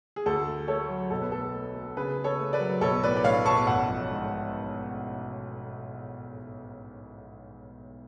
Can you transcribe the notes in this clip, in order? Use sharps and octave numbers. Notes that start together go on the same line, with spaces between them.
G#4
D2 A4
A3
A3 A4 C#5
F#3
B1 A4
B4
A3 A4
A3
A3
C#3 G#4 B4
C#3
A4 C#5
A3
B4 D5
F#3
B1 A4 C#5
A2 B4 D5
D5
A2 C#5 F5
B1 A5 C#6
A1 F#5 A5
F3
G#2